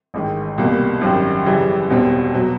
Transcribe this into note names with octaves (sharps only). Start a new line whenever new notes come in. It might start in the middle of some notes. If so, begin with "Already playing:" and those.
A1 G#2 D#3
C2 B2 G3 A#3
G#1 F#2 D#3 G3
F#2 C#3 E3 G3
E1 E2 B2 G3 C4
B2 F#3